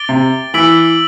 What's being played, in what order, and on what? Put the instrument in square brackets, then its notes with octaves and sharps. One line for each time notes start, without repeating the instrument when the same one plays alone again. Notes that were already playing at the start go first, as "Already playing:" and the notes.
Already playing: [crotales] D6 A6 D7 G7
[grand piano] C3
[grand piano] E3 [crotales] E6 B6 D7 F#7